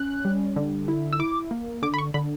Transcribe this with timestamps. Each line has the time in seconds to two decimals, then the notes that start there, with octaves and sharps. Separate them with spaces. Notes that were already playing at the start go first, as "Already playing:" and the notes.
Already playing: C#4 F#6
0.25 G3
0.56 D3
0.88 E4
1.13 E6
1.19 E4 D6
1.51 A#3
1.82 D3 D6
1.94 B5
1.98 C#6
2.14 D3 B5